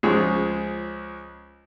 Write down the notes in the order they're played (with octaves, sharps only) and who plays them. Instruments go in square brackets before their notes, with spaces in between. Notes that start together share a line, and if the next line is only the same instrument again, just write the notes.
[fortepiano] C#2 F3 G#3 G#4 C#5